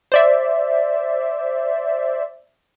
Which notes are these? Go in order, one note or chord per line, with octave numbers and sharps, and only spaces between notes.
C5 D5 E5